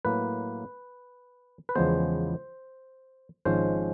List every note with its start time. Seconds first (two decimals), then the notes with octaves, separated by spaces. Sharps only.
0.05 A2 F#3 A#3 B4
1.69 B4
1.75 E2 C#3 F3 G#3 B3 C5
3.45 G#1 G#2 F3 G#3 C#4 C5